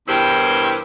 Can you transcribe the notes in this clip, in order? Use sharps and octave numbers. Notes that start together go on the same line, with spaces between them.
E2 G2 E4 G4 A#4 C5